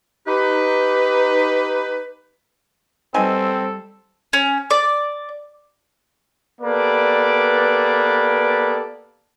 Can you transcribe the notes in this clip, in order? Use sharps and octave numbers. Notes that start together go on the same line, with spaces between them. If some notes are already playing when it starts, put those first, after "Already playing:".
D#4 G4 B4
B2 G3 C4 D#4 A4 G#5
C#4
D5
A#3 B3 G4 A4 B4 D5